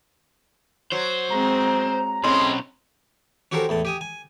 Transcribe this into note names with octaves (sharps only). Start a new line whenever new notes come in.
F#3 C5
G#3 C4 A#5
B1 A2 G#3 C4 C#4 B5 C6
C#4 F#4 G4 A4 A#4 C5
E2 A2 A5
G4 G#5 D#6
G#5